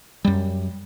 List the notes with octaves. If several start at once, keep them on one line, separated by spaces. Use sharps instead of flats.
F#2 G3